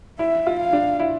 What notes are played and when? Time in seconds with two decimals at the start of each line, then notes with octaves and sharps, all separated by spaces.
0.19 E4 E5
0.47 F4
0.60 F5
0.73 D4
1.00 E4